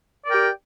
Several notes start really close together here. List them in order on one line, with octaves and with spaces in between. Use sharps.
D5 A#4 G5 G4